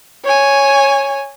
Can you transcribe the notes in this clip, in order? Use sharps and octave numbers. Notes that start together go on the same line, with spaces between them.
C#5 G#5